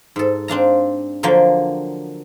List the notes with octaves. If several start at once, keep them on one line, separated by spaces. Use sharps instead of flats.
G#2 A4
C4 D4 F5 A#5
D3 F3 F#3 A#3 G5